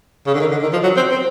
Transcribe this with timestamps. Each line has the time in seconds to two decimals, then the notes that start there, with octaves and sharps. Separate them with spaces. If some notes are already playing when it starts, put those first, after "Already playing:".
0.26 C#3
0.34 D3
0.40 D#3
0.51 D3
0.63 D#3
0.73 F3
0.83 F#3
0.97 C4
1.11 C4